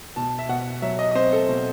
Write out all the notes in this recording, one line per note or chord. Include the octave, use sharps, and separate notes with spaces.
B2 A5
E5
B2 F#5
F#3 E5
D#5
D#5
C4 C5
A4
B2